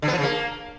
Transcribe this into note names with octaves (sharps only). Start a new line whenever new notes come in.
D3
B3
F3
C#3
A#3